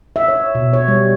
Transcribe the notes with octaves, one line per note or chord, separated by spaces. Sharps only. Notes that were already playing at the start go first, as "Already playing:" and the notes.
E5
C#5
B2
C#5
G3